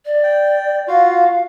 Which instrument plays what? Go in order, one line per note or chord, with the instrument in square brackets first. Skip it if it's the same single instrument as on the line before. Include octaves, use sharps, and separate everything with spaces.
[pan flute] D5
[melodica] G5
[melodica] F4 F#4 [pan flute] F5